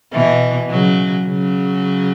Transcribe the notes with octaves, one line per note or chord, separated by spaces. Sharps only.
B2 E3
C#3 F#3
C#3 F#3